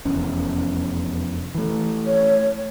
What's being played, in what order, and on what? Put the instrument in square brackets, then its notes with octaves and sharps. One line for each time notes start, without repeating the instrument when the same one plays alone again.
[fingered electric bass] F1 E2 C#4
E3 A3
[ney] C#5